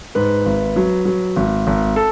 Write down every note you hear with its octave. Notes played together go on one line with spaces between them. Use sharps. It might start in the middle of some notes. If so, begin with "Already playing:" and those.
G#2 B4
G#1
F#3
F#3
G#1
G#1
A4